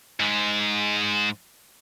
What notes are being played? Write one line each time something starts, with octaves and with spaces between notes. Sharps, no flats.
G#2 G#3